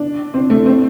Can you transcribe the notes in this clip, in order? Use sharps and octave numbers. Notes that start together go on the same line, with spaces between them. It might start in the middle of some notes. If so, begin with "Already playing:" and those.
Already playing: D4
C4
A3
C4